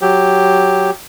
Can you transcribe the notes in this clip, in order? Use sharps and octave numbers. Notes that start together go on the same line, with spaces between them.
F#3 G4